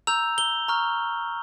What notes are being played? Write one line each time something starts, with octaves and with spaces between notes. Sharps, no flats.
A#5 E6 G6 F7
G7
A#5 C#6 F6